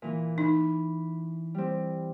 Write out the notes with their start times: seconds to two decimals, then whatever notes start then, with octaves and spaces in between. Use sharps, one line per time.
0.02 A#2 E3
0.38 D#4 B5
1.54 G3 C4